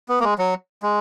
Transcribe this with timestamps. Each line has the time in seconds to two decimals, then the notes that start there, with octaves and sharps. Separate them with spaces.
0.09 B3
0.20 A#3
0.24 G#3
0.39 F#3
0.83 G#3